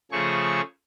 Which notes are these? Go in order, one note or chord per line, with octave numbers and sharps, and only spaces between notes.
C#3 F3 A3 G#4 C#6